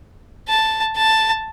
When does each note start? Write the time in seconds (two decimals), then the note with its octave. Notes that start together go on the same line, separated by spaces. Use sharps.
0.48 A5
0.96 A5